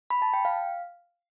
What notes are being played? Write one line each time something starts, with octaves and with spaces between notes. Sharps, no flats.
B5
A5
G5
F5